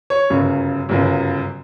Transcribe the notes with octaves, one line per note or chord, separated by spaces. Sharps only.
C#5
G1 F#2 C#3
G1 F#2 C#3